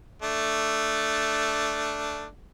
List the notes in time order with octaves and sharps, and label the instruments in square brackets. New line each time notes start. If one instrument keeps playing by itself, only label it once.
[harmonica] A3 D4